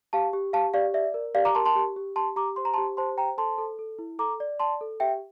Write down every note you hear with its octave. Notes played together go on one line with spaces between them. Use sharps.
G4 F5 A5
G4
G4 F5 A5
G4 D5 F5
D5 E5
A#4
G4 D5 F5
A#5 D6
A#4 A5 C6
A5 C6
G4
G4
G4 A5 C6
G4 A#5 D6
C5 C6
A#5
A5 C6
G4
C5 A5 C6
C5 G5 A#5
A4 A5 C6
A4
A4
E4
A4 A#5 D6
D5
D5 A5 C6
A4
G4 E5 G5